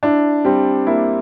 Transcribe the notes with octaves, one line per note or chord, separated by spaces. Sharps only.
D4 E4
G3 C4
A#3 E4